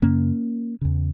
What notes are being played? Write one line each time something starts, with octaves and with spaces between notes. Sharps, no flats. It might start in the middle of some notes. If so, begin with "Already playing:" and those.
F#2 C#3 A#3 C#4
E2 C#3